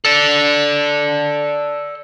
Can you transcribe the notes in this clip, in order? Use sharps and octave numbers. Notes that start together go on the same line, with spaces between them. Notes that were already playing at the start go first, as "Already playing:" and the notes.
A4 D5